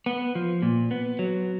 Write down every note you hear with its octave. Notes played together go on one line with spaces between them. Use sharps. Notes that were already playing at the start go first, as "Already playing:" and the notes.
B3
F3
A#2
B3
F#3